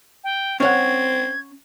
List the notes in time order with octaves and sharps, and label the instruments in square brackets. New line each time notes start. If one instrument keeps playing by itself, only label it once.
[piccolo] G5
[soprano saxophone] C4 [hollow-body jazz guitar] C#4 C#5 F#5 [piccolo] G#6